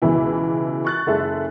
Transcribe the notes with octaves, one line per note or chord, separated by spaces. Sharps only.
C#2 B2 E3 E4
C#6 F#6 A6
F#1 G#3 A4 E5